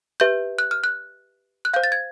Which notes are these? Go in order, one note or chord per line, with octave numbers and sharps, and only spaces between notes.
G4 B4 E5 G6
F#6
F6
F#6
F#6
C5 F5 G6
A6
G#6